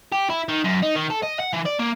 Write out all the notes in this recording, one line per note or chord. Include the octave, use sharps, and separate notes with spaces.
G4
E4
D#3
F#2
D#4
D#3
A4
D#5
F#5
E3
D5
A#3